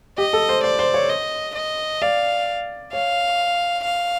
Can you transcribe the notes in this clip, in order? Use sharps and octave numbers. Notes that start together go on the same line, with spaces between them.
G4 D#5
A4
C5
C5 D5
C5
C#5
D#5
D#5
D5 F5
C#5 F5
F5